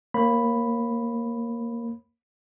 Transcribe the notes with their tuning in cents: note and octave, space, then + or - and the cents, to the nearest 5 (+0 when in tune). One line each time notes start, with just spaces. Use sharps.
A#3 +0 C#5 -30 B5 +0